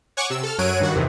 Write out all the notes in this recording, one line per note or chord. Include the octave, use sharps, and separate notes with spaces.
C#5 F#5 G#5 C#6 D6
C3 E6
A4 F6
F#2 F#3 C#5 F#6 D7 D#7
G2 D#3 F#4 F#5
E2 C3 D#3 E3